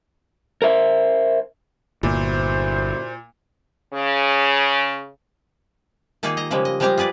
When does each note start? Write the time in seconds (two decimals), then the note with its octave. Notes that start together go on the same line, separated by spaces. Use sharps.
0.62 A#4 C5 E5
2.03 G1 A#2 E4 F#4 C5
3.94 C#3
6.23 D#3 A#3 D#4 F4 G#4
6.37 D#5 A#5
6.51 C#3 F3 G3 G#3 A#3
6.65 D#5
6.80 F3 G3 G#3 G4 F5 A#5
6.98 F4 G#4 B4 D5